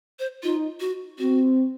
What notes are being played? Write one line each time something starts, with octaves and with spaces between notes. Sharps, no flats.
C5
D#4 F4
F#4
C4 F#4